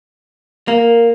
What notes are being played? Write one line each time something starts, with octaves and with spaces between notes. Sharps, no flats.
A#3 A#4